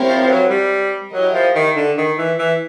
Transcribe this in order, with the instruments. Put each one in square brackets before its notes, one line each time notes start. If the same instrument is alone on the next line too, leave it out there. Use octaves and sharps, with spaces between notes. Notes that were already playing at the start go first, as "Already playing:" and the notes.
Already playing: [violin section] C4 E4 G4 A#4 C#5
[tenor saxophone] F3
F3
F#3
G3
[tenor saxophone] F#3 [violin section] E4 G4 A#4 D#5
[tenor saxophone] F3
D#3
D3
D#3
E3
E3